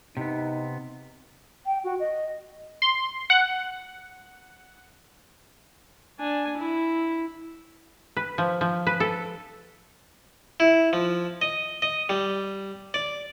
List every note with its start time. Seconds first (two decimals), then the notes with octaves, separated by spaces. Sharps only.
0.17 C3 B3 D#4
1.66 G5
1.84 F#4
2.00 D#5
2.82 C6
3.30 F#5
6.19 D4 G#5
6.58 E4
8.17 B4
8.38 F3
8.61 F3
8.87 B4
9.00 A4
10.60 E4
10.93 F3
11.42 D#5
11.82 D#5
12.09 G3
12.94 D5